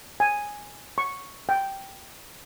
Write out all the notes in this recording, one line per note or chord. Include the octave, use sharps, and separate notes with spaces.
G#5
C#6
G5